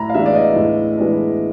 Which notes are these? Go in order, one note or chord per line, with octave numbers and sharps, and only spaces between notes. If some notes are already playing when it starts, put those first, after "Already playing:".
Already playing: A2 A#5 B5
F5
E3 G#3 B3 D4 E5
D5
D#5
A2
E3 G#3 B3 D4